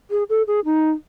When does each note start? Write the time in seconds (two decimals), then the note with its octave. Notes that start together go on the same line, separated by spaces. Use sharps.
0.11 G#4
0.29 A4
0.47 G#4
0.65 D#4